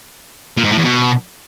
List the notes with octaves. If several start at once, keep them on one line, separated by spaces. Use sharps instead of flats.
A#2
G#2
A2
E2
B2